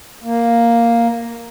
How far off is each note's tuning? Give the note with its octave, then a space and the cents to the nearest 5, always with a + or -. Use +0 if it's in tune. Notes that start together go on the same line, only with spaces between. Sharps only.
A#3 +0